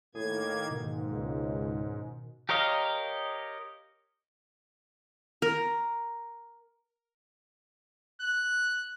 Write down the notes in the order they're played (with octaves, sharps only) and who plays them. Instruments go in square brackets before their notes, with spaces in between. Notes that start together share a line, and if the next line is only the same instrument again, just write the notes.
[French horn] A2 [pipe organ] D#3 A#3 G#6 [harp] G#4
[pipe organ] G#2 [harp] B2 D#3 [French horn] A#3
[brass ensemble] C#2
[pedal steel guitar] G4 A#4 C#5 D#5 F5
[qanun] A#4
[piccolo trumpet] F#6